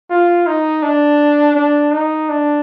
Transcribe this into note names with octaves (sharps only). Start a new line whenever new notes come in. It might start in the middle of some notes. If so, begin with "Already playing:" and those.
F4
D#4
D4
D4
D#4
D4